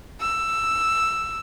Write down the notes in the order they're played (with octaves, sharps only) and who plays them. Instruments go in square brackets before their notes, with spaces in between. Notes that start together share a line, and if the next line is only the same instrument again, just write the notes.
[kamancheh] E6